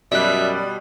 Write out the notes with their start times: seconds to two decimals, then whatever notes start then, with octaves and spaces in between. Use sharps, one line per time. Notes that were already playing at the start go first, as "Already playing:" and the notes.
0.12 F#2 B2 G3 D5 E5 F#6